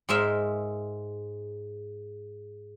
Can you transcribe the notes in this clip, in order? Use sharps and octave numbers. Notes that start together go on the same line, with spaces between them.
G#2 G#3 A#4 E5 C6